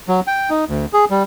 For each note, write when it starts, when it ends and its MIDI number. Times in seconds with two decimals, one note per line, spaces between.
0.08 0.20 54
0.27 0.50 79
0.50 0.65 63
0.69 0.85 38
0.93 1.05 68
1.10 1.23 55